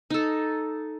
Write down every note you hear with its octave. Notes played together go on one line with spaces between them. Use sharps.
D#4 A4